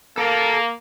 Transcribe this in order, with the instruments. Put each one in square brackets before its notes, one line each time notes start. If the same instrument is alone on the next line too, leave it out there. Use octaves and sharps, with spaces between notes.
[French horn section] A#3 [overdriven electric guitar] A4 A#4